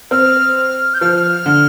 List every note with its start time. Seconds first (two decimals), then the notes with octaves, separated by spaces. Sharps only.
0.11 C4 F6
0.94 G6
1.01 F3 F6
1.46 D3